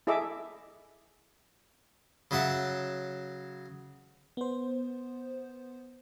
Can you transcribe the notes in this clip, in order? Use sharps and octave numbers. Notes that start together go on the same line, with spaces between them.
E4 G#4 A4 D#5 E5 D6
C#3 F#3 E5 F#5 A5
B3 C5